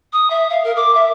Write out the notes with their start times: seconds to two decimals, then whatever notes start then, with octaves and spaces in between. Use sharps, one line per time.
0.12 D#6
0.30 E5
0.49 F5
0.64 A#4
0.76 D6
0.94 E5